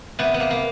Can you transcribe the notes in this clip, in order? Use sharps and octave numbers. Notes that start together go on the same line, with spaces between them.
C3 B3
B3
A#3
A#3